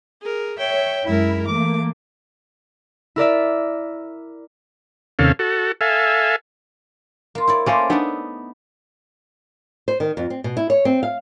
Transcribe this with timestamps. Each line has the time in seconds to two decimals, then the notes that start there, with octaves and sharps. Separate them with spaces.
0.21 G#4 A#4
0.58 C#5 E5 G5
1.05 F#2 G#3 E4 A#4 E5
1.47 E3 A3 A#3 D6
3.16 E4 A#4 D5 E5
5.19 D#2 C3 C#4 A4 F5
5.39 F#4 A4
5.81 A4 E5 F5 G#5
7.35 A#3 F4
7.47 E4 C#5 D5
7.66 A3 A#3 C#4 C5 D5
7.90 B3 D4 D#4 D5 E5
9.88 C5
10.00 D#3
10.17 F2
10.30 C4
10.44 B2
10.57 E4
10.70 C#5
10.85 C4
11.03 F5